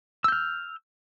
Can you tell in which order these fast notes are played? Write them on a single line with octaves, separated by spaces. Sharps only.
E6 G6 F6